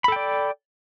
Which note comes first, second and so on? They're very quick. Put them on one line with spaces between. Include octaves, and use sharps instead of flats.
B5 A4 G5 D5